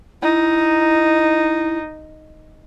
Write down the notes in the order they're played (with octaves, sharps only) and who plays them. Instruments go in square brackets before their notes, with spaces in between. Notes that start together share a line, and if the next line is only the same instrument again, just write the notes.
[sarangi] D#4 [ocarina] E4